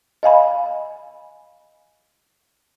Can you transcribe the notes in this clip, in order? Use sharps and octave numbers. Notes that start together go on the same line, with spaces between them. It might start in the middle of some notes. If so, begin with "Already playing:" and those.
D#5 F5 G#5 B5